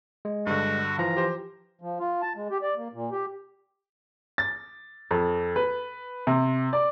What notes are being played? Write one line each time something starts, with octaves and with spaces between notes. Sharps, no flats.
G#3
G2 D3 F#4
E3 F3 F4 A#5
G4 C5
F3
F4
A5
G#3
G4
D5
A#3
A#2
G4
A6
F2
B4
C3
D5